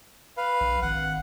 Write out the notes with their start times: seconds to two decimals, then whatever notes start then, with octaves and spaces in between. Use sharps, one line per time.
0.37 B4 F5
0.60 A#1
0.82 G#1 F#5